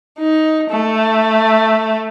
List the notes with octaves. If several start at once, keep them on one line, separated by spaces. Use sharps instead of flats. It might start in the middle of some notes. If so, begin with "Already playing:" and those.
D#4
A3